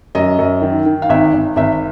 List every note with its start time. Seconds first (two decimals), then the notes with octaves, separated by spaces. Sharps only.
0.15 F#2 D#5
0.39 F#2
0.62 D#3
0.86 D#3
1.02 F5
1.09 G#1 E5
1.33 G#1
1.56 G#1 E5